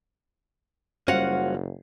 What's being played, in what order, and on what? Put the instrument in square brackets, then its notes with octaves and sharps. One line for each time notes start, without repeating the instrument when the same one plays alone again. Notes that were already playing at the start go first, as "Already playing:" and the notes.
[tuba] F#1 [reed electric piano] G3 C5 [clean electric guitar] C#4 F#4 F5 [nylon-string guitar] F4 F#5